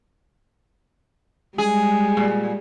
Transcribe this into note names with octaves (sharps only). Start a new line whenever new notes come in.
G3 G#3 G#4
A#2